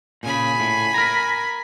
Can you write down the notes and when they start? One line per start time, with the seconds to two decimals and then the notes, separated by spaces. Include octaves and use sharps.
0.23 A#2 C#3 G#5 B5
0.60 A2
0.94 A#4 A#5